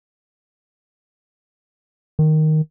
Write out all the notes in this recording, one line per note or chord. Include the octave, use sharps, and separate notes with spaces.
D#3